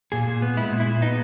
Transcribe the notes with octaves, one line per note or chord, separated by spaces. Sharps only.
A#2 G#4
A#2
B3
G#3 E4
A#2
E4
A#2
B3 D#4